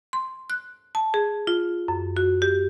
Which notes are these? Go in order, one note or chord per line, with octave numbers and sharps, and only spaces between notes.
C6
F#6
A5
G#4
F4
F#2
F#4
G4